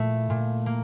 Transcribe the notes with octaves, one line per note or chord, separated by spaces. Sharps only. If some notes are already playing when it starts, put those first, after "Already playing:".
Already playing: A#2 A3 E4
A#2
A#3